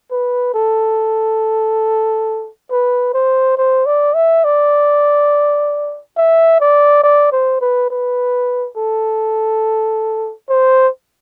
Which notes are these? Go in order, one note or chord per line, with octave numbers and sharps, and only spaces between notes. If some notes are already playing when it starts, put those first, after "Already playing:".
B4
A4
B4
C5
C5
D5
E5
D5
E5
D5
D5
C5
B4
B4
A4
C5